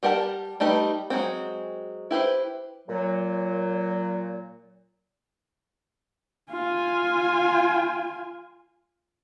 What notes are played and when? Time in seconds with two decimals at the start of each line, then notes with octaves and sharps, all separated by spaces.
0.03 G3 G4 A#4 F#5 A5
0.60 G3 A3 D#4 G4 B4
1.10 F#3 G#3 C4
2.11 E4 G4 B4 C5
2.89 A#2 F#3
6.51 F4 G#5